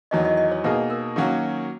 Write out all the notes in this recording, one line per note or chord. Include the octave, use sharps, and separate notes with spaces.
E2 D#3 F#3 D#5
D#5
D#5
C#5
B2 A#3 D#4 G#4 B4
A#4
D#3 F#3 A#3 C#4 F#4